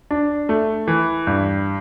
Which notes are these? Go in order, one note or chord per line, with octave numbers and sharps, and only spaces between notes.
D4
A3
E3
G2